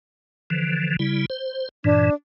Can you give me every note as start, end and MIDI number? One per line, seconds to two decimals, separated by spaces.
0.50 0.96 50
0.50 0.96 52
0.50 0.96 53
0.99 1.26 49
0.99 1.26 55
0.99 1.26 64
1.30 1.69 72
1.84 2.10 43
1.84 2.10 46
1.84 2.10 52
1.84 2.14 62